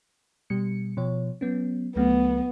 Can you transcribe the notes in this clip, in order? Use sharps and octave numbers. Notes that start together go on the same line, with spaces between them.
B2 G3 C#7
B2 F3 C#5
F#3 B3 C#4
C#2 F#3 A3 B3